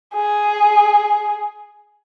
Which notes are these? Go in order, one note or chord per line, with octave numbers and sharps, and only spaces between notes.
G#4